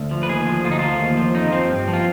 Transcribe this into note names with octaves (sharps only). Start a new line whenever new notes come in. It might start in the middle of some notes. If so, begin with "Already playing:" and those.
Already playing: D2
F3
B4
D#2 G#4
F3
D2 F4
D#4
F3 F4
D#2
F3
F2 D#4
F3 C4
G2
F3
F4